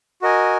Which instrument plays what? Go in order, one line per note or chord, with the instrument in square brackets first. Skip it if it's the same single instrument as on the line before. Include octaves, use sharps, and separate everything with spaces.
[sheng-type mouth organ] F#4 A#4 D#5 G#5